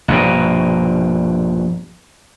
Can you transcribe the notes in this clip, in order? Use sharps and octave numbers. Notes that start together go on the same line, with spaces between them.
A#1 G2 B2